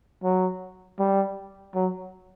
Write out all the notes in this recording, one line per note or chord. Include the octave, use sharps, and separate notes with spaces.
F#3
G3
F#3